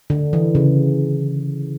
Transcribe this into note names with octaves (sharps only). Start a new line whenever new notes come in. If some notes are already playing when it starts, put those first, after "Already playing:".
D3
E3
C#3